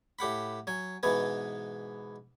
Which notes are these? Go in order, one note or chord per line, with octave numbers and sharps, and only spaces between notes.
A2 G4 F#5 B5
F#3 G#5
G#2 B2 E3 B3 G#5